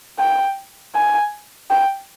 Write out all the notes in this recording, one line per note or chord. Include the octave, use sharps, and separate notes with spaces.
G5
G#5
G5